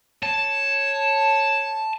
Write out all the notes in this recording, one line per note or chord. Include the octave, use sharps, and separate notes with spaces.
C#5 A5